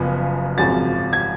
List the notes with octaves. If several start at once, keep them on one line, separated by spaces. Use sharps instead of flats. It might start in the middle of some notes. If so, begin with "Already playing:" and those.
Already playing: F#1 F#2 C#3 F3 B3
G#1 F#2 C#3 F3 A6
G#6